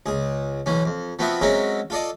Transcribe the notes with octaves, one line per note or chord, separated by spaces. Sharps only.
C#2 G#4
B1 E3 C#4
F2
F3 B3 C4 F#4 E5
F#3 G#3 C4 C#4 A#4 E5
F4 A4 D5 D#5